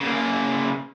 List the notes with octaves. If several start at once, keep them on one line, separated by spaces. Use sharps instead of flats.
C#3 A#3